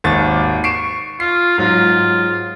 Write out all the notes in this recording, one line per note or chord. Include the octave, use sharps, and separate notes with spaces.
G#1 D#2 A6
C#6 C7 D7 E7
F4 C7
G#2 F#3 F4